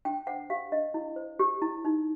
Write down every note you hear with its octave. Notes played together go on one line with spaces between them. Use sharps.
D4 G5
C5 F#5
G4 F5
D4 D#5
E4
C5
G4
E4
D#4